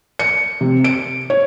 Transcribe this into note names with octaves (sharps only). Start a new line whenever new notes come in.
C#7
C3
D7
C#5